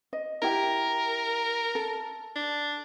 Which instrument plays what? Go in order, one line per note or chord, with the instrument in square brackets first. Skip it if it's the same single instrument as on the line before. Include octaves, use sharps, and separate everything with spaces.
[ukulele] D#5
[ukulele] E4 G4 G5 [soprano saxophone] A#4
[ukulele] A4
[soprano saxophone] D4